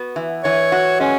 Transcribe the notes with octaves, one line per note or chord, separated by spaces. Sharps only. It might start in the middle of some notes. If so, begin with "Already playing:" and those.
Already playing: B3 F#4
E3
E3 C#5
F#4
G#3 C#4